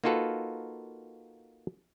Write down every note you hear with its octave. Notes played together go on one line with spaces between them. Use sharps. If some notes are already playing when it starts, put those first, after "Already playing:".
A#3 D#4 F4 F#4 A4 B4